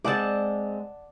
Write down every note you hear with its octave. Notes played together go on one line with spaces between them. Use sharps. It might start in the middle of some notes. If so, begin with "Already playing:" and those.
G#3 C4 D5 F#5 A5